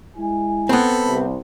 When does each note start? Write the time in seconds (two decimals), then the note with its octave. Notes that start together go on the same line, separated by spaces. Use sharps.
0.17 G#3 E4 G#5
0.69 B3 C4 A4 B5
1.06 C2